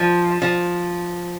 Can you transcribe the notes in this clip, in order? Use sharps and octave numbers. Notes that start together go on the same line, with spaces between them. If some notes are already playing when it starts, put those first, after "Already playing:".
Already playing: F3
F3